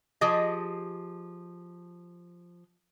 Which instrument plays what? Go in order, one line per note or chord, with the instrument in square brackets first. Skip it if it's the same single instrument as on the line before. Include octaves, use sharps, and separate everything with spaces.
[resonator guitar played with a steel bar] F3 G4 G#4 D#5